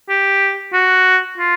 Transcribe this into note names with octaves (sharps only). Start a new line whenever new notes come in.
G4
F#4
F4